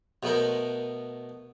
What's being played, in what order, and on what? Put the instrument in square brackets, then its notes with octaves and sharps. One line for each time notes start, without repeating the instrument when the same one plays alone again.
[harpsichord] B2 A3 B3 A#4 C5